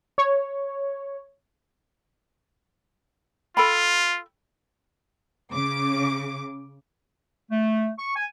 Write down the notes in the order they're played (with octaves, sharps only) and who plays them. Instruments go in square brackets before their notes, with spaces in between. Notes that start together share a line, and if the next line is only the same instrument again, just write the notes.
[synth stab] C#5
[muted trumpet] F4 [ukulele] A4 G5 B5
[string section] C#3 D6
[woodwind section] A3
C#6
G#5